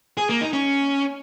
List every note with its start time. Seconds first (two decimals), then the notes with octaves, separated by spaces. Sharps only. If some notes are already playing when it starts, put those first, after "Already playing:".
0.17 G#4
0.29 A#3
0.41 D#4
0.53 C#4